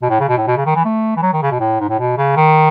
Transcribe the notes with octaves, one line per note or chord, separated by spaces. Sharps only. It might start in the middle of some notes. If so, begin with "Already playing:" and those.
B2
A2
C#3
B2
A2
B2
C#3
D#3
E3
A3
E3
F#3
D#3
C#3
B2
A2
G#2
A2
B2
C#3
D#3